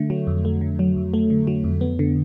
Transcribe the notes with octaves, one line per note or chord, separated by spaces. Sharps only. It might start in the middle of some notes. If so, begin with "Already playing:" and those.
Already playing: D3 A3
F#3
F2
A3
D3
F#3
F2
A3
D3
F#3
F2
B3
D3